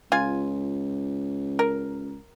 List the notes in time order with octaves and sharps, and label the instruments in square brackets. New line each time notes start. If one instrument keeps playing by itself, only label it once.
[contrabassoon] C#2 [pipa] F4 G#5
[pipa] A#4